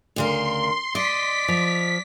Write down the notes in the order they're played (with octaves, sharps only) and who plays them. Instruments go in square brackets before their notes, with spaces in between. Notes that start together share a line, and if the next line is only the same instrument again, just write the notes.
[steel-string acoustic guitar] D2 C#3 A#4 [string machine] C6
[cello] D5 [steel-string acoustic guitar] D#5 [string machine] B6
[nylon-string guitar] F3